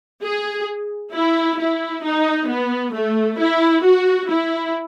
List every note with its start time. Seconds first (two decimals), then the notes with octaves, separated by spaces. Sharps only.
0.23 G#4
1.14 E4
1.59 E4
2.04 D#4
2.49 B3
2.94 A3
3.39 E4
3.84 F#4
4.30 E4